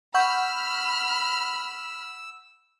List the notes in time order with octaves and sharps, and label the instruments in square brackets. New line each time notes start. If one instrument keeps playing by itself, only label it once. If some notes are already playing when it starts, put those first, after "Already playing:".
[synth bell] F#5 C#6 G6 [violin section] B5 F6 [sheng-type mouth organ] E6